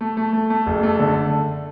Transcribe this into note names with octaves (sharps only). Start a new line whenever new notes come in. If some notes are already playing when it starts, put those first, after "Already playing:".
A3
A3
A3
A3
F#1
A3
D3